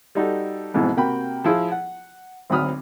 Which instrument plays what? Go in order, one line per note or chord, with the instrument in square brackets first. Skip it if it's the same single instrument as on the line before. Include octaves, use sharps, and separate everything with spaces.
[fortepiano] G3 D#4 F#4 A4
F2 G#2 B2 E3
C3 A#3 F#4 G5 B5
F3 E4 F4 G#4
F#5
G#1 D2 F#3 B5 D#6 F6